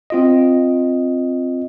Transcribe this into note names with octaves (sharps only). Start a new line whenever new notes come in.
C4 F4 D#5